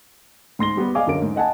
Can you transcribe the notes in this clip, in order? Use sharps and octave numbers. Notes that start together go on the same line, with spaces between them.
G#2 C6 A#6 G7
G3 B3
G#4 D5 D#5 F5 G#5 D6
F#2 D3 C#4 A#4 D7
G#2
D#5 F#5 G#5 A5